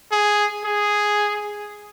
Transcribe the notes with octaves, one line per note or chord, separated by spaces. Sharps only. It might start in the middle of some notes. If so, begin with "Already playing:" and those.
G#4
G#4